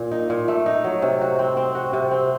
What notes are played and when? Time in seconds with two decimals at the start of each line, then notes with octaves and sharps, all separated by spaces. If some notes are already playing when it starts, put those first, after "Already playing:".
Already playing: A#2
0.12 D#4
0.30 A#2
0.48 A3
0.66 D#4
0.84 F#3
1.02 C3
1.21 F#4
1.39 C4
1.57 C4
1.75 F#4
1.93 C3
2.11 C4